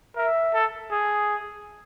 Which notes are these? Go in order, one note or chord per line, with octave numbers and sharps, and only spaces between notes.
A#4 E5
A4
G#4